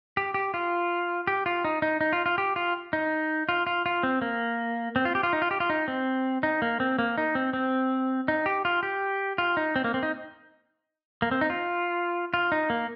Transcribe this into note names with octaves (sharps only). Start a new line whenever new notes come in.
G4
G4
F4
G4
F4
D#4
D#4
D#4
F4
F4
G4
F4
D#4
F4
F4
F4
C4
A#3
C4
F4
G4
F4
D#4
F4
G4
F4
D#4
C4
D#4
A#3
C4
A#3
D#4
C4
C4
D#4
G4
F4
G4
F4
D#4
C4
A#3
C4
D#4
A#3
C4
D#4
F4
F4
D#4
A#3